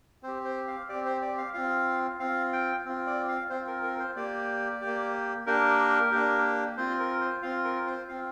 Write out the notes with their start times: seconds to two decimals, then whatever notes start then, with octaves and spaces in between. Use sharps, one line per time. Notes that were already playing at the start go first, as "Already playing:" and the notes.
0.23 C4 G4 C5
0.45 C5
0.67 F5
0.89 C4 G4 D5
1.06 C5
1.22 D5
1.38 F5
1.53 C4 F4 F5
2.20 C4 F4 F5
2.53 G5
2.85 C4 F4
3.07 D5
3.28 F5
3.50 C4 F4 C5
3.67 A#4
3.83 A#4
3.99 C5
4.16 A#3 G4 D5
4.81 G4
4.86 A#3
5.46 A#3 D4 G4 A#4
6.12 A#3 D4 G4
6.77 C4 F4 C5
6.99 A#4
7.21 C5
7.42 C4 F4 F5
7.65 A#4
7.87 C5
8.08 C4 F4 F5